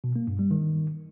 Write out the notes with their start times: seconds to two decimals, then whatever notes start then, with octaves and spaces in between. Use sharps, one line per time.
0.04 B2
0.16 A#3
0.27 G2
0.39 G3
0.51 D#3